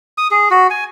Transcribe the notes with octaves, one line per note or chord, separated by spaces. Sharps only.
D#6
G#4
F#4
G#5